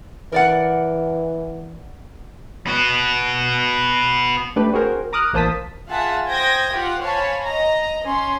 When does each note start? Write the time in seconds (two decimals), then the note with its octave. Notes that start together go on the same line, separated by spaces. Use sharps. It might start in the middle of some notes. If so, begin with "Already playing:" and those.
0.32 E3 A#4 D5 F#5
2.67 B3 F#4
4.56 A3 D4 G4 B4
4.72 C4 F#4 G#4 A#4 C5
5.13 A#5 D6 D#6 F6 F#6
5.33 A1 A#3 C5 A5 D#6 B6
5.88 F4 G#4 E5 F#5 A5
6.29 C5 G5 D#6 G6 G#6 A#6
6.72 F4 G4 F#5
7.02 C5 C#5 F5 G#5 A5 B5
7.42 D#5 A#5
8.03 C#4 C6